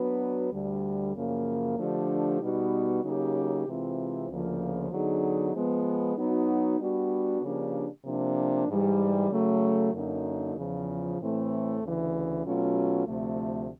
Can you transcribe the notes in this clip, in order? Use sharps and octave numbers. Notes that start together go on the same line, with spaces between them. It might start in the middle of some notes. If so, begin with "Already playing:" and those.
Already playing: F#3 B3 D4 F#4 B4
D2 D3 G3
F#2 C#3 F3 A#3
D3 F3 A3 D4 G4
B2 G3 B3 D#4 F#4
C#3 F#3 A#3 D#4 G4
C3 E3 G#3 C4 F4
D2 C#3 F3 A#3
D3 F#3 B3 D#4 G#4
F3 G#3 B3
F#3 B3 D#4 F#4
G3 B3 D4 F#4
C#3 F3 A#3 D4 G4
C3 F3 A#3 D4
G#2 E3 G3
C#3 F#3 A3
F#2 D3 F#3 A#3 D#4
E2 C#3 F3
A2 E3 A3 C4
D2 C#3 E3
B2 F#3 A3 C#4 F4
D2 C3 F3 A3